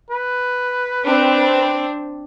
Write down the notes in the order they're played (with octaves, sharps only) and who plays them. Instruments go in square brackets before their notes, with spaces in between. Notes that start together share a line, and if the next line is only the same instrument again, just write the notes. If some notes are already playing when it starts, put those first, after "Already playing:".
[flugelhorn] B4
[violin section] C4 D4